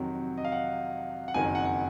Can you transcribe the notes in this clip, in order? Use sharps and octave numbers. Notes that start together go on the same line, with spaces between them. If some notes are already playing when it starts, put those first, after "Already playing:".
Already playing: F2 C3 D#3 F#3
D#5
F5
F#5
F#5
F#1 F2 D#3 F#3 G#5
F#5
F#5